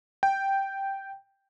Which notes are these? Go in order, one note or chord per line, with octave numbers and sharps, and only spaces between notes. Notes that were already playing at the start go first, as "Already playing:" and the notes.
G5